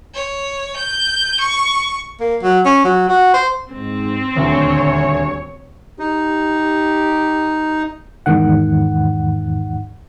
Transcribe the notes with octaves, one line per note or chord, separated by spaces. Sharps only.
C#5
G6
C#6
A#3
F#3
C#4
F#3
F#4
C5
G#2 C4
D#1 D2 D3 G3 C#5 G#5
D#4 G4
E2 G#2 D#3 F#5